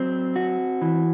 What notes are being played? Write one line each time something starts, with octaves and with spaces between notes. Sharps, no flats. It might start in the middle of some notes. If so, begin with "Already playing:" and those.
Already playing: F#3 C4
F#4
E3